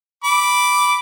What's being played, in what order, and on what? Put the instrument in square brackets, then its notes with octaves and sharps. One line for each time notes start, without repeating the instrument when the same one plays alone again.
[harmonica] B5 D6